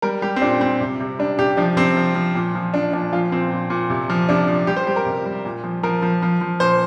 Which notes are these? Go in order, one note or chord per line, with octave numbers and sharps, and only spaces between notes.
G3 A#4
G3 G4
C4
A#2 D4
G3 C4
C3
C3
G3 D4
C3 G4
F3 D4
C3 C4
F3
F3
A#2
F3
F3 D4
A#2 D4
F3 F4
A#2 C4
A#2
A#2
C3
F3
C3 D4
F3
G3 G4
C5
G3 G4
A#4
C3
G3
A#2
F3
F3 A#4
F3
F3
F3
A#2 C5